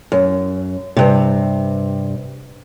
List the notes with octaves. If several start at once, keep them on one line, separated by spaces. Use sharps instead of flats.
F#2
G2 C3